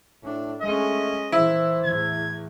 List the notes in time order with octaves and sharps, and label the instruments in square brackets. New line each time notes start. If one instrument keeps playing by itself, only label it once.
[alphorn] A2 [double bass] D4
[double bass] G#3 C#4 [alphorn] A3 [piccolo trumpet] D#5
[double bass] A#2 E3 [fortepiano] E4 [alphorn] C5
[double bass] E2 A2 [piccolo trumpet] G#6